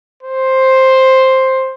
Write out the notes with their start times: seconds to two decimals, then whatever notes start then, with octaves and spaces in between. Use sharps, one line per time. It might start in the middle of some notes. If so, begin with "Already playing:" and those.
0.23 C5